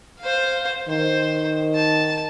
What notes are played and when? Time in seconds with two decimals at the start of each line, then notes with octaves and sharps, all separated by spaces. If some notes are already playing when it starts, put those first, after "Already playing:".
0.20 C5 F5
0.88 D#3 C5
1.75 A5